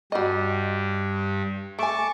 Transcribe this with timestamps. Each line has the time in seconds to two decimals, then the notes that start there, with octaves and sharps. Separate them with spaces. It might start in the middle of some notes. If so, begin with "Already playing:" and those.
0.12 G2 G3 F#4 D#5
1.79 A3 G#5 A5 C#6 D6